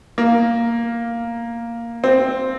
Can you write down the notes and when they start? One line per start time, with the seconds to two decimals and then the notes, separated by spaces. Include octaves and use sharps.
0.18 A#3
2.04 C4